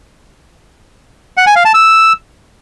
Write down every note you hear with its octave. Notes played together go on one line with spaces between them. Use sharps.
F#5
G#5
F5
A5
E6